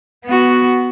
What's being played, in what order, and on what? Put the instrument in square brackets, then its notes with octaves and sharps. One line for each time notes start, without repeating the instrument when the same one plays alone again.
[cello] B3 F#4